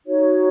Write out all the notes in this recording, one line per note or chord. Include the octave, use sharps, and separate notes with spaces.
D#4 F#4 C#5